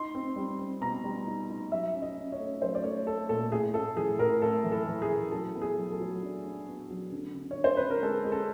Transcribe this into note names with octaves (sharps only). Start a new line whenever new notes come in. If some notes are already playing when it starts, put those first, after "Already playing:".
Already playing: D#4 C6
C4
G3
C4
B2 A#5
G3
D#4
D#4
F#3 E5
C#4
D#5
C#4
C#5
A3
F#3 C5
D5
A3 C#5
A3 A4
A#2 A4
A2 G#4
A2 A4
E3 G#4
A2 A#4
A2 A4
E3
A4
E3
G#4
E3
F#3 A4
B3
G#4
F#3
A4
F#3
D4
D4
B3
F#3
D3
D3
C#5
D3
C5
D3 B4
A#4
G#3 A4
G#3
A4